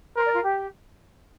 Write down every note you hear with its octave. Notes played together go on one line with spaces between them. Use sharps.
A#4 C5
D5
F4
G4